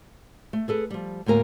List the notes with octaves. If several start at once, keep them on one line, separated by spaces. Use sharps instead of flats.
A3
G#4 A4 B4
F3 G3
D2 A2 A#3 A#4 G#5